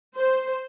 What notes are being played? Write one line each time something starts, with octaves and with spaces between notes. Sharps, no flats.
C5